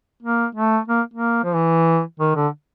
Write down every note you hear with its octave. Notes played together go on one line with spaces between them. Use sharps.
A#3
A3
A#3
A#3
F3
E3
D#3
D3